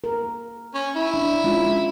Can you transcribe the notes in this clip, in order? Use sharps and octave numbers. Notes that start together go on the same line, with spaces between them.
A#4
C#4
E4
D4
G#3 C#4 F4